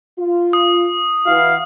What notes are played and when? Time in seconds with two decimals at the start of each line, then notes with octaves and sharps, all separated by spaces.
0.19 F4
0.53 D#6
1.26 E3 E4 F#4 F5